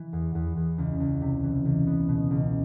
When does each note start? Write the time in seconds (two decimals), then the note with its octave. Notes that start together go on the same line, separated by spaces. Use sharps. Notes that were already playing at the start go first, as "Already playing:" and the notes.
Already playing: E3
0.13 E2
0.35 E2
0.57 E2
0.78 C#2
1.00 C#2
1.21 C3
1.43 E3
1.65 C#2
1.87 B3
2.09 B2
2.31 C#2